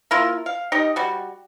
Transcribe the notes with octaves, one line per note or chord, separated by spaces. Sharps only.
A#3 E4 F4
F5
D#4 G4 D#5
G3 F#4